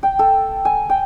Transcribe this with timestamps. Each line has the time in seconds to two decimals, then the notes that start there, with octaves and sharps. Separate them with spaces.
0.03 G5
0.19 A4
0.65 G#5
0.89 G5